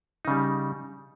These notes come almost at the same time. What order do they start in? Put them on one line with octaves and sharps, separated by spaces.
D#4 C#3 G3